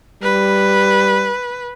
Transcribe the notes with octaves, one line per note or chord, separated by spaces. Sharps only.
G3 B4